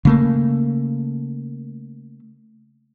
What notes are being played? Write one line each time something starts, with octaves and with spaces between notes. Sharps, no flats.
C#3 A3 A#3